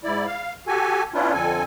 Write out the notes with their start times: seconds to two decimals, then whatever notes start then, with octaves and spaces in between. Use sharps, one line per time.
0.04 G#2 E4 D5
0.27 F5
0.67 F#4 G4 A4 G#5
1.14 B3 C#4 D4 E4 F4
1.33 F2 D3 C4 A4 G#5